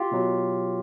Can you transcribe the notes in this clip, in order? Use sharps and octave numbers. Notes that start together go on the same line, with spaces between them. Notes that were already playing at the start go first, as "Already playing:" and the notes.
Already playing: F4 G4
B2 F#3